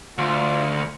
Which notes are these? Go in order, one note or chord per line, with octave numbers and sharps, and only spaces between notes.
D2 F4